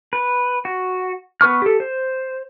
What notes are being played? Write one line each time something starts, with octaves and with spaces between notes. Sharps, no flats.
B4
F#4
B3 B4 C#6 F6
G4 A4
C5